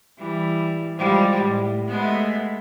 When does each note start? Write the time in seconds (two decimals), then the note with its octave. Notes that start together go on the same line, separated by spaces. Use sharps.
0.18 E3 G3
0.97 F3 G3 G#3
1.40 A2
1.88 G#3 A3 B3